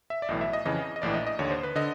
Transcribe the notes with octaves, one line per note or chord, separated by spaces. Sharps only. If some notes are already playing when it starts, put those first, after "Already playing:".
E5
D5
B1 A2 E3 D#5
E5
D#5
F2 C#3 E3 D#5
D#5
A#1 A2 E3 D5
D#5
D#5
D#2 D3 C#5
C5
B4
D3 D#5